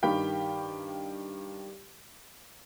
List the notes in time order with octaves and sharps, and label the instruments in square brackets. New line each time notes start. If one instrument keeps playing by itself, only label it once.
[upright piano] G2 D#3 G4 F5 G5 B5